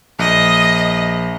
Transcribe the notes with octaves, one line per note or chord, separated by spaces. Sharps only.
A#1 D#5